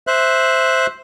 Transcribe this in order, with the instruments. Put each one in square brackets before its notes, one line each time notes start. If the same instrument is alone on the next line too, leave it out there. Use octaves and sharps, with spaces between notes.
[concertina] C5 E5 F#6